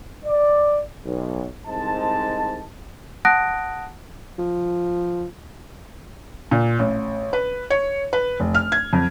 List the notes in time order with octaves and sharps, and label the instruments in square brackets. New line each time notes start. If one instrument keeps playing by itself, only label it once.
[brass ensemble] D5
B1
C2 G#2 C4 D#5 A5
[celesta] F#5 A5 D#6 F#6 A#6 D7
[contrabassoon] F3
[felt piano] A#2
A1
B4
C#5
B4
F1
F6
G#6
F2